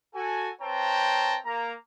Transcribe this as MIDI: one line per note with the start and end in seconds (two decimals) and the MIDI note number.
0.15 0.50 66
0.15 0.50 69
0.15 0.50 80
0.62 1.38 60
0.62 1.38 71
0.62 1.38 73
0.62 1.38 79
0.62 1.38 81
0.62 1.38 82
1.46 1.74 58
1.46 1.74 82